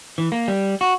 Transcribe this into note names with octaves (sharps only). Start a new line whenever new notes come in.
E3
A#3
G3
F#4